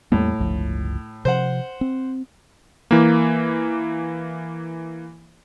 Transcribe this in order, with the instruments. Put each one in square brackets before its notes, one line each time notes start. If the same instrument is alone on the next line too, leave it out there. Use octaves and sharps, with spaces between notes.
[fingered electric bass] E2 G3 A#3 [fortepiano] A2
[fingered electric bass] G1 C#2 F3
[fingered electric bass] C3 F3 [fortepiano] C5 F#5
[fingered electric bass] C4
[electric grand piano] E3 A#3